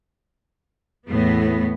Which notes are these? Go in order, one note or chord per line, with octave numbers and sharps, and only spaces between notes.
E2 A2 B3